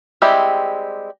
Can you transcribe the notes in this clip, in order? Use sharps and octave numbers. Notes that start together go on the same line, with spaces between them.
G3 G#3 C4 E4 G4